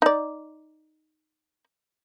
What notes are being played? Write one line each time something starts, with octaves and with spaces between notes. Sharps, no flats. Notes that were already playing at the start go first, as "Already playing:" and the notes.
D#4 D5